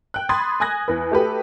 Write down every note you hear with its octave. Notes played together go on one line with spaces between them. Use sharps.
G5 F#6
B5 C6 D#6 G#6 A6
G#5 D#6 F#6 G#6 A#6
E2 B4
A3 F#4 G4 A4 B4